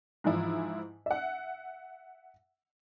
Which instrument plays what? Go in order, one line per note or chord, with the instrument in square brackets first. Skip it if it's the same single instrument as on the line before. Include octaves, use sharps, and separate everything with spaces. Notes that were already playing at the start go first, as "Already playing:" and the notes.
[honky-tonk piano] G#2 E3 F3 E4
E5 F#5